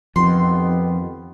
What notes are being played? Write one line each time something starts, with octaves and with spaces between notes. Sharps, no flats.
F2 D#3 F3 B3 G4 C6